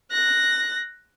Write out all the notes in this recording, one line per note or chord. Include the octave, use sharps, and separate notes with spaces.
F#6 A#6